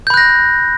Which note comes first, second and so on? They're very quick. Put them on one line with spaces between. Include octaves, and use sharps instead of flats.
G6 B5 F#6 A#6